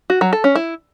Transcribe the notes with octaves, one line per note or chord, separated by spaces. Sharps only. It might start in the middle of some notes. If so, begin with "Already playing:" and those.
F#4
F#3
A4
C#4
E4